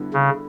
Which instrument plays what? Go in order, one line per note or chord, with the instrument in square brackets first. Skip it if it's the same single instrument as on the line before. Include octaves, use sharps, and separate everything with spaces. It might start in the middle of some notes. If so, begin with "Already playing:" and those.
Already playing: [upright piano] D3 G3 B3 E4
[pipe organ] C#3